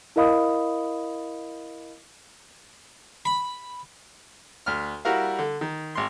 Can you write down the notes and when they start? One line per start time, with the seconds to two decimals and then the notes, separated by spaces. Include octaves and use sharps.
0.16 E4 A#4 D#5 F5 B5 D#6
3.25 B5
4.66 D2 F6
5.05 G3 E4 F#4 A#4 F5
5.39 D3
5.61 D#3
5.95 G#1 C6